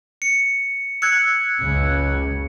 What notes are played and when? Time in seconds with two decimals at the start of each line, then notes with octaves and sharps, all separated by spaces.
0.22 C#7
1.02 E6 F#6 G#6 C#7
1.60 F#1 C#2 C#3